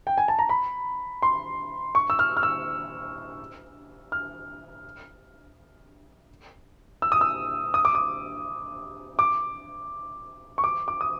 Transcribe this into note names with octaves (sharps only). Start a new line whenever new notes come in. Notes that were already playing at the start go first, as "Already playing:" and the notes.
G5
G#5
A5
A#5
B5
C6
C#6
E6
F6
F6
E6
F6
E6
D#6
E6
D#6
D6
D#6
D6
C#6
D6
D6
D#6